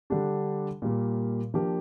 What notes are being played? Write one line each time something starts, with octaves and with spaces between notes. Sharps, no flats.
D3 G3 D4 G4
A#2 G3 A#3
F3 A#3 D4 G4 A#4